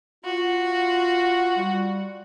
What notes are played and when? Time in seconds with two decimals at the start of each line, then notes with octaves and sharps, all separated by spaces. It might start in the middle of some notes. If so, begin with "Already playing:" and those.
0.24 F4 F#4
1.57 G3